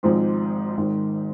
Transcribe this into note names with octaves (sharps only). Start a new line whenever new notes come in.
G#1 G#2 F3 G#3 C4
G#1 G#2 D#3